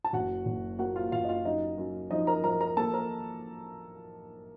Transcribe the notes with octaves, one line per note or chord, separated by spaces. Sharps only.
A5
F#1 F#4 F#5
F#1
A#3 F#4 F#5
F4 F5
F#1 F4 F5
D#5
F4 F5
F#2 D#4 D#5
F#2
F3 D#4 D#5
A#4 A#5
F3 A#4 A#5
A#4 A#5
A#3 A4 A5
A#4 A#5